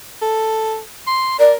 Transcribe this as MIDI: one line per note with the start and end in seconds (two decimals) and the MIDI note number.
0.22 0.80 69
1.07 1.39 84
1.39 1.57 70
1.39 1.51 74